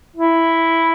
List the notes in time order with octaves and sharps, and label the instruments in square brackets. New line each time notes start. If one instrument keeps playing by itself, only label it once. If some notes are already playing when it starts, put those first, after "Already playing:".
[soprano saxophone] E4